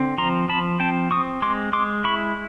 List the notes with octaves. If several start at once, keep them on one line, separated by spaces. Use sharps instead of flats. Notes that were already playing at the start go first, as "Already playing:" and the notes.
Already playing: D3 C4
F3 A#5 C6
F3 A5 B5
C4 G5 A5
C4 C#6 D#6
G#3 C6 D6
G#3 C6 D6
E4 B5 C#6